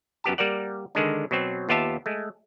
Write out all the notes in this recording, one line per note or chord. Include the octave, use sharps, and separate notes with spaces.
F#2 B3 G4 A5
G3 A#3 A#4 D5 F#5
D3 D#3 G#3 D4
B2 F#3 C4
D#2 B3 F4 G4 E5 A5
G#3 A3